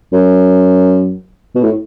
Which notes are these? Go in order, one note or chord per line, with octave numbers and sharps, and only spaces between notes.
F#2
B2
A2